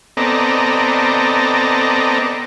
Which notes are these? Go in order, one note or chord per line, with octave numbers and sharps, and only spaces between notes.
B3 C4 A4 D5 D#5 A#5